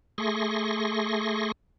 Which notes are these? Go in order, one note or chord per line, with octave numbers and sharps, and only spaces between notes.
A3 G#4 C6 C#6 A#6